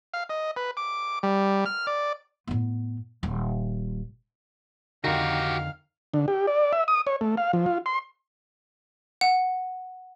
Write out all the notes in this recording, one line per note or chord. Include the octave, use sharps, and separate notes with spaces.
F5
D#5
B4
D6
G3
F6
D5
A2 B3
D#1
F2 D3 D#3 F#4 G4 F5
D3
G4
D5
E5
D#6
C#5
A3
F5
F3
F4
C6
F#5